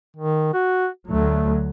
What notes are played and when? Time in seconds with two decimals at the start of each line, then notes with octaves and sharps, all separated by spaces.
0.17 D#3
0.54 F#4
1.07 D2 F#3 A3